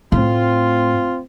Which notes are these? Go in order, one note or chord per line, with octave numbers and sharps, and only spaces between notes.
A2 C4 F4